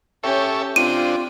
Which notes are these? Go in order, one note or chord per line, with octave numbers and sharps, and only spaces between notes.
C#4 G4 A4 C#5 E5
C4 D4 F4 G5 D#7